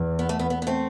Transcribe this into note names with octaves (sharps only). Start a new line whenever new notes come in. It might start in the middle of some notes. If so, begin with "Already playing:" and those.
Already playing: E2
B3
A3
B3
B3
B3
A3 C4